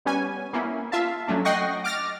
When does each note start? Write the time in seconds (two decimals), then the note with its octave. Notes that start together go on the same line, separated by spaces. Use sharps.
0.05 G3 B3 C#4 G#5
0.53 A#3 B3 C#4 E4
0.92 F4 E5 F5 A5
1.27 F#3 A3 C#4 D4
1.45 D#5 F#5 G5 C#6 A#6 C7
1.84 D6 F6 A6 A#6